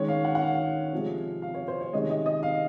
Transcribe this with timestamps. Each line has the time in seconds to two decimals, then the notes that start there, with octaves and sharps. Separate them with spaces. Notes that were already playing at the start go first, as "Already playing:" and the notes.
Already playing: D#3 G#3 C#4 C#5
0.08 F5
0.25 F#5
0.35 F#5
0.42 F5
0.92 C3 F3 G#3
1.42 F5
1.54 C#5
1.68 C5
1.81 C#5
1.93 C3 D#3 G#3 C#4 D#5
2.10 D#5
2.26 D#5
2.43 F5